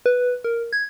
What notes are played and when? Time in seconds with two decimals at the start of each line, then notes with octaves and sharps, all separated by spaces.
0.06 B4
0.44 A#4
0.73 G#6